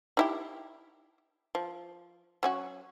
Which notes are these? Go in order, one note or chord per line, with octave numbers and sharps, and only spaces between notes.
D#4 E4 G4
F3
F#3 C#4 F#4